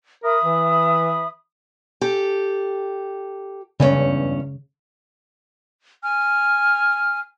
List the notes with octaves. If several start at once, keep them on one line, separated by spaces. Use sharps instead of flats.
A#4 E5 B5 D#6
E3
G4 A4
E2 G2 C#3 C#4
G#5 F6